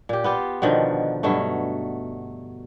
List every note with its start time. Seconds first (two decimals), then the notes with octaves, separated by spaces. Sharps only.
0.09 A#2 G4
0.24 B3 F4 G4
0.62 B2 D3 D#3 F3
1.23 G2 B2 F#3 A3